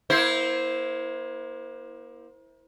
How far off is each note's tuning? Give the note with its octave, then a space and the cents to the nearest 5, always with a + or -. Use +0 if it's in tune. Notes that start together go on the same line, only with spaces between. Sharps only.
A#3 +35 E4 -10 C5 +0